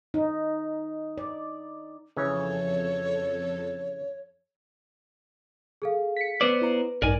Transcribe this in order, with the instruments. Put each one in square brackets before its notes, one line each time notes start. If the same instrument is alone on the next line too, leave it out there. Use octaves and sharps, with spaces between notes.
[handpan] D#4
D5
[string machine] F2 A4 [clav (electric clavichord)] C#3 E3 C#4 [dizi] C#5
[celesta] G#4 A4 F5
[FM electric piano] B6 C#7
[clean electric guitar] B3 C5 D5 [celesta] B4
[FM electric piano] E4 A#5
[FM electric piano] A1 G2 D#4 [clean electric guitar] A#4 D5 G#5